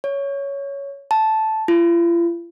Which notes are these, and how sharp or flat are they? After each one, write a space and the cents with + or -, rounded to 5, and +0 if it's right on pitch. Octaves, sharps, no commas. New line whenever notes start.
C#5 +10
A5 -5
F4 -45